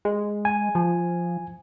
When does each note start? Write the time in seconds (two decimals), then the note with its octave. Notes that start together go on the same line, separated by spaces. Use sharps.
0.05 G#3
0.45 G#5
0.75 F3